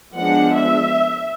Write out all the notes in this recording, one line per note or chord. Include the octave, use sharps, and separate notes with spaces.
F3 G#3 B3 D4 F#5
E5